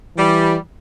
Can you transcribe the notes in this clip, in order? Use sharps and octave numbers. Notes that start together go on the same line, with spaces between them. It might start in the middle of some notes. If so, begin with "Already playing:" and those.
E3 G3